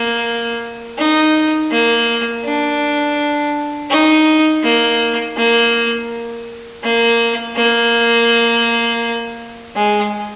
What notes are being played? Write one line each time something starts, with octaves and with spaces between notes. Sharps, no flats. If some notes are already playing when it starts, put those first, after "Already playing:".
Already playing: A#3
D#4
A#3
D4
D#4
A#3
A#3
A#3
A#3
G#3